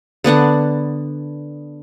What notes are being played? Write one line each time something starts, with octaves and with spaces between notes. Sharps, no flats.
D3 B3 D4 F#5